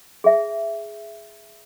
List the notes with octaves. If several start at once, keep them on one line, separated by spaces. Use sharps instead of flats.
G#4 E5